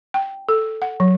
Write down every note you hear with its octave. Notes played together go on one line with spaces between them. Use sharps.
G5
A4
F#5
F#3